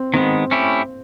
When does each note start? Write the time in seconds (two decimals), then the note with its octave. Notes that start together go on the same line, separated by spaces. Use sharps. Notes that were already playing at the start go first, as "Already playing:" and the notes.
Already playing: C4
0.14 D#3 G#3 B3 C4
0.51 A3 C#4 E4 G4